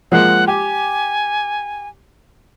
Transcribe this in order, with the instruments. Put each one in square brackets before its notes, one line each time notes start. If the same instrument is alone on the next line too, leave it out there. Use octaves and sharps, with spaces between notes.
[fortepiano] F3 G#3 A#3 [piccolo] F#5
[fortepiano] G4 [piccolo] G#5